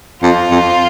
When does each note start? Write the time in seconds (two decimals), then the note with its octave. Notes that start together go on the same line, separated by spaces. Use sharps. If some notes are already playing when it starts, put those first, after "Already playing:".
0.23 F2 F4
0.51 F2